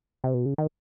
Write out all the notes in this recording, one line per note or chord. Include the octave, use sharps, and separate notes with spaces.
C3
B2
C#3
D#3